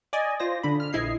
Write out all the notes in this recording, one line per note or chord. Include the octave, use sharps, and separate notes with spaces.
D5 D#5 G#5
F4 C5 A#6
D3 D4 B5
F6
A#1 E4 D#5 G#6 C7